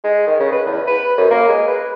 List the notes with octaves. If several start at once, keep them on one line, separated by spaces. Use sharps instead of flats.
G#3
D#3
C#3
B4
E2
B4
F#2
A#3
G#3
B4